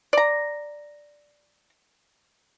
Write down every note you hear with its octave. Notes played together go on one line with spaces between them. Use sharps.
D5 A#5